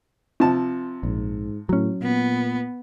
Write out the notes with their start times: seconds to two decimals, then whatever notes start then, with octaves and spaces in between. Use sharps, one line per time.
0.40 C3 F3 A5
1.03 A#1 G#2
1.69 A2 F#3 C#4
2.01 A#2 B3